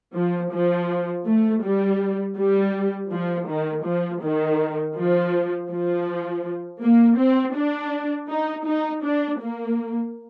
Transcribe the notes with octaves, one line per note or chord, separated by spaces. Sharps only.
F3
F3
A3
G3
G3
F3
D#3
F3
D#3
F3
F3
A#3
C4
D4
D#4
D#4
D4
A#3